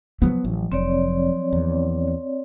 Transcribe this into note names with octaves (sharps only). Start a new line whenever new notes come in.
F3 F#3 B3
A1
F1 C4 C#5 D5
E2